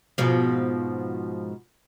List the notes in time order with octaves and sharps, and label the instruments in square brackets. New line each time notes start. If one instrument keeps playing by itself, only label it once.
[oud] G#2 B2 F3